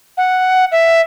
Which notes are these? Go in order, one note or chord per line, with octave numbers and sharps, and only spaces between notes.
F#5
E5